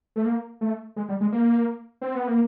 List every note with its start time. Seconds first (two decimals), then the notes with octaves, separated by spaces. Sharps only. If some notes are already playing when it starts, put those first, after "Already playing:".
0.16 A3
0.25 A#3
0.61 A3
0.96 G#3
1.09 G3
1.21 G#3
1.32 A#3
2.01 C4
2.15 B3
2.27 A#3